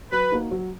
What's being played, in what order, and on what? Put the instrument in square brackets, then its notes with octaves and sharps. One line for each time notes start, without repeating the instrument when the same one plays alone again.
[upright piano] F#3 [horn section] B4
[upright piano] A#3 D#4 F#4
F#3